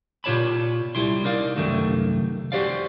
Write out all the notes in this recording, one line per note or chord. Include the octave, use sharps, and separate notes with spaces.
A#2 F4 G4 C#5 A5 B5
C2 G3 E4 C6
D#4 A#4 D5 F5
C2 F#2 D#3 A3 F#4
F#4 G4 C5 D5 F5